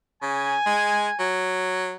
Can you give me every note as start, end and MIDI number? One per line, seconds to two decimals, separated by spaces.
0.22 0.55 49
0.22 1.32 80
0.66 1.09 56
1.20 1.96 54